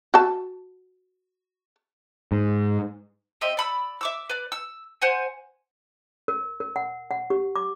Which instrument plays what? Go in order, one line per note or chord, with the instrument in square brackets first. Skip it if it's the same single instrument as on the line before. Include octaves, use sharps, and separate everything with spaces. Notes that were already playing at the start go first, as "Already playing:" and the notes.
[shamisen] F#4 A5
[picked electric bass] G#2
[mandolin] C4 G4 D#5 E5
D5 B5 E6
E5 D6 E6
B4 D5
E6
C5 F#5 G#5
[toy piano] A#4
A#4
F#5
F#5
G4
D6